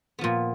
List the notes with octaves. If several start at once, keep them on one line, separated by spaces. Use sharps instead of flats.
A#2 F3 B3